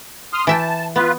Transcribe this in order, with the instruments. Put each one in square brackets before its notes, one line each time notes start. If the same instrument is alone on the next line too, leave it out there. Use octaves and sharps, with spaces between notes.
[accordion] C6 D#6 F6
[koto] E3 E5 G5 [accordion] A5
[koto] B3 [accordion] F4 B4